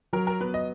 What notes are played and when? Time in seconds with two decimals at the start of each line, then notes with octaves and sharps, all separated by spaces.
0.13 F#3 A#4
0.27 A#4
0.40 B3 B4
0.54 D#5